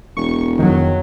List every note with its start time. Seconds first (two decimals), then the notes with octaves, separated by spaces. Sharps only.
0.17 E1 C#6
0.59 F2 D#3 F#3